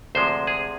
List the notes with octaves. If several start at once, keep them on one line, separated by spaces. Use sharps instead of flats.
D2 C3 F3 G#3 C5
G#4